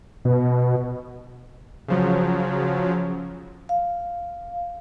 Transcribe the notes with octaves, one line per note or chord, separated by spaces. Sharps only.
B2
C#3 F3 F#3
F5